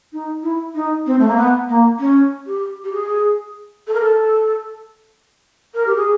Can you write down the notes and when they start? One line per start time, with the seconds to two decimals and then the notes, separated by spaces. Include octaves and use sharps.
0.13 D#4
0.43 E4
0.75 D#4
1.06 C4
1.19 A3
1.28 A#3
1.36 B3
1.68 A#3
1.99 C#4
2.46 G4
2.84 G4
2.92 G#4
3.87 A4
3.94 A#4
4.00 A4
5.74 A#4
5.86 G4
5.96 G#4